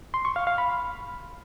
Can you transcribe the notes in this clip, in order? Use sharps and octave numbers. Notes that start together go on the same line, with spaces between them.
C6
C#6
F5
F5
B5